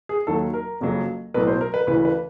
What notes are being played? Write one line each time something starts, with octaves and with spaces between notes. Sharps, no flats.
G#4
D#2 D#3 F#3 A4
A#4
F#1 F2 C#3 F#3
B1 A2 F#3 B4
C5
A#4
B4
D2 C#3 E3 B4
B4